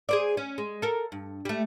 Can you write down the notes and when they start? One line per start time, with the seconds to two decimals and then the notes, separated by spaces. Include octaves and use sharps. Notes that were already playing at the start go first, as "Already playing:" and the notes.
0.09 G#4 C5 D5
0.37 C#4
0.58 G#3
0.82 A4 A#4
1.12 G2
1.45 G3 A3